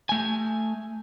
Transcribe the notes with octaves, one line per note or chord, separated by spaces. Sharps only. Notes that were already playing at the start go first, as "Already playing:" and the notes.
A3 G#5